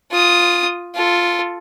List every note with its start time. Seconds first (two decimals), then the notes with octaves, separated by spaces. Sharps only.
0.12 F4 D#6
0.95 F4 A4